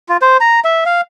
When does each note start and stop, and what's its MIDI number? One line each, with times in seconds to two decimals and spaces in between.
0.09 0.17 65
0.22 0.37 72
0.41 0.60 82
0.64 0.84 76
0.86 1.01 77